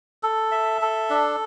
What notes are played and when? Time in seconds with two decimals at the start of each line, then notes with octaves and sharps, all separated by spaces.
0.23 A4
0.51 E5
0.82 A4
1.10 D4